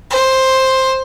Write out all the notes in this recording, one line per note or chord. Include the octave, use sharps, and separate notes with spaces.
C5